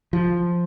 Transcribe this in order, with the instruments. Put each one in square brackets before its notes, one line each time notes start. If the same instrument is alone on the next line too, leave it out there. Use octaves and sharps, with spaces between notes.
[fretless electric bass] F3